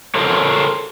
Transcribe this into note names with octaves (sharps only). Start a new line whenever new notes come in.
A4 A#4 C5 C#5